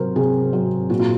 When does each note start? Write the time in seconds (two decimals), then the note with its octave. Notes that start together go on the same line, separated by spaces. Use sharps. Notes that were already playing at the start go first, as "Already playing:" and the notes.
Already playing: C3 F#3 A#4 C5
0.16 C3 G#4
0.53 F#3
0.89 A#2 F#4
0.99 F4